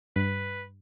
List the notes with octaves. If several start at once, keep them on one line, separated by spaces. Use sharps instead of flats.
G2 B4